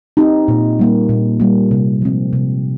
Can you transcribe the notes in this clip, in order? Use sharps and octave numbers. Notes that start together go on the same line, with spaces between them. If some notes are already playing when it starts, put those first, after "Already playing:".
C4 D#4 G4
A#2
G3 A#3
A#2
G3 A#3
C3
F3 G#3 C4
C3